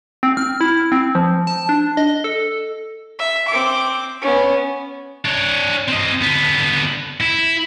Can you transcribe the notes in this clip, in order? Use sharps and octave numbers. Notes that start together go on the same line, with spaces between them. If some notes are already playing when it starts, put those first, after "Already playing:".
C4
F6
E4
C4
F3
A5
D4
D#5
A4
E5
C4 D6
B3 C#4
D4 C#5
C4 D#5
D3 B3
E4